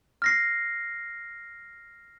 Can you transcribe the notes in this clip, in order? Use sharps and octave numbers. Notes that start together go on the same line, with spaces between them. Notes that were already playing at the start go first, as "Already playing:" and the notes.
F6 A#6 C7